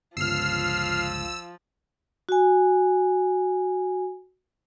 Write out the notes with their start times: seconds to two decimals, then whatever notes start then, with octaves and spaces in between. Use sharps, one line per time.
0.17 G1 C#2 F3 E6 F6 C7
2.29 F#4 G#5